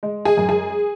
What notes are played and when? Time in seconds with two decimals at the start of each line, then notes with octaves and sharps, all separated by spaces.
0.03 G#3
0.25 G#4
0.37 F#2
0.49 G#4